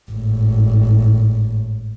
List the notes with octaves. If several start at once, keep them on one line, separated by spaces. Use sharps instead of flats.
G#1 A2